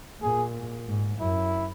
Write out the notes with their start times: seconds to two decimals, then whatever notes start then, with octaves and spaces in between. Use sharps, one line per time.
0.22 A#2 G#4
0.87 G#2
1.20 F#2 E4